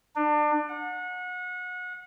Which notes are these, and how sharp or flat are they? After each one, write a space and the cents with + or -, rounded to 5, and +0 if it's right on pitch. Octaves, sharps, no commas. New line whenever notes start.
D4 +30
F#5 -30